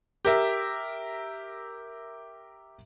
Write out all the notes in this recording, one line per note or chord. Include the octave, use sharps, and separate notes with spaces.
G4 A#4 E5